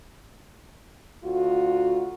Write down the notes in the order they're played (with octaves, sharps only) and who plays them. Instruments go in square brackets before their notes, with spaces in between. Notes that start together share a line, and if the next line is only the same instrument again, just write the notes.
[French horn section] D2 F4 F#4